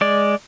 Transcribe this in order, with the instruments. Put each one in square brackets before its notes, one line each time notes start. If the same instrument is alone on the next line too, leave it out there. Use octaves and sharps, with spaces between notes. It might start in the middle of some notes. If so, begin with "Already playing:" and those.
[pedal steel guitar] G#3 D5